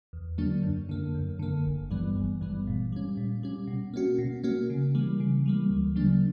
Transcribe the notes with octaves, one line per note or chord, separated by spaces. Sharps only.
E2
D3 F#3 A#3 D4
F#2
D3 A#3
F#2
D3 A#3
G1
G2 E3 G3 B3
G1
G2 E3 G3 B3
A#2
G3 C#4
A#2
G3 C#4
B2
A#3 C#4 F#4
B2
A#3 C#4 F#4
C#3
E3 G3 A#3
C#3
E3 G3 A#3
D2
C#3 F#3 A#3 D4